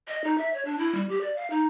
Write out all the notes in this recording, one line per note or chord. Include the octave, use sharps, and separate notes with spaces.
D#5
D#4
E5
C#5
D4
E4
G3
G4
D5
F5
D#4